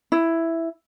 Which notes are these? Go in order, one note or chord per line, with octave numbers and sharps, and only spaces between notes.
E4